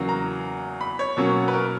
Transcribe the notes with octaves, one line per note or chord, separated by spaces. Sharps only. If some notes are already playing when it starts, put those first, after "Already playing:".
Already playing: E2 C#3 F#3 A#3
A#5
B5
C#5
B2 F#3 A#3 C#4
B4
A#4